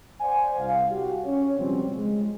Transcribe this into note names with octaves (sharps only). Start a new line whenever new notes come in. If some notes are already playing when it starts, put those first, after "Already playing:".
C5 D5 F#5 G#5
C2 F5
F#4 G4 F5
C#4 C#5
C#2 B2 F3 G3 C4 C#4
G#3